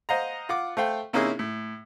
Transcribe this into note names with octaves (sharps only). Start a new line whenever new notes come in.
C5 D#5 F5 F#5 A#5
F4 F#5 D6
A3 C5 F5 G5
C3 A#3 C#4 D#4 E4 G#4
A2